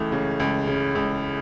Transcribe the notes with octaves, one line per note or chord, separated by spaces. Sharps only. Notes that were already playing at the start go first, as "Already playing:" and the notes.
Already playing: C#2 C#3 E3 A3
C#3
C#2
C#3
C#2